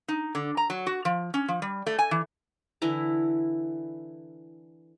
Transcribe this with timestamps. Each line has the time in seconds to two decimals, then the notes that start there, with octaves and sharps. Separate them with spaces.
0.08 D#4
0.35 D3
0.57 A#5
0.70 F#3
0.87 F#4
1.05 F3
1.34 C#4
1.48 F3
1.62 G3
1.86 A3
1.99 G#5
2.11 E3
2.82 D3 E3 E4 A#5